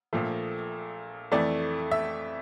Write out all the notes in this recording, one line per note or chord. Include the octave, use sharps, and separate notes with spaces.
A#1 A#2 F3 A3
F2 E3 A3 D5
E5